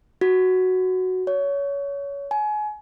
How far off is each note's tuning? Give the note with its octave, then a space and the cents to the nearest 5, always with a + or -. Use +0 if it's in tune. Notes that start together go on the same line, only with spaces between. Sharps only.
F#4 +0
C#5 +25
G#5 +30